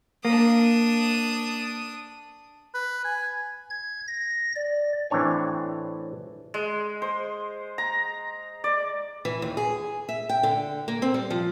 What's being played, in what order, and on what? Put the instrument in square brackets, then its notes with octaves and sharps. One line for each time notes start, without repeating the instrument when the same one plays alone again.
[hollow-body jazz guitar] A#3 [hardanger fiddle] D4 D#6
[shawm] B4
G#5
[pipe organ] G#6
A#6
D5
[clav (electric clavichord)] A2 E3 C4 D4 C#5 G#5
[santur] G#3
C5
A#5
D5
[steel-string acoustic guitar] E3
D#2
G#4
E5
G5
D3
A#3
C4
G3
F3